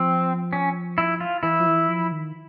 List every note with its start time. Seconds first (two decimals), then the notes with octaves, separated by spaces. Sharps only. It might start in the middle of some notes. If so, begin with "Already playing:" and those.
Already playing: F3 C4
0.53 C#4
0.98 E4
1.20 F4
1.43 E3 E4
1.60 F3
1.67 E3
1.89 F3
2.12 D#3